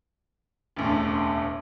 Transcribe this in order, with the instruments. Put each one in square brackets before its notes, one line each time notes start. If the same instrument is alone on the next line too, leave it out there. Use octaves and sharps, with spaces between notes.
[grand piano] E1 A1 D2